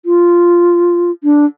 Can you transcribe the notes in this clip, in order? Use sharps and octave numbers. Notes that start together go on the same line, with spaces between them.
F4
D4